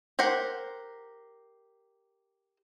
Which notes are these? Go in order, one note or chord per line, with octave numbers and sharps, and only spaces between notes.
G4 A#4 C5 F#5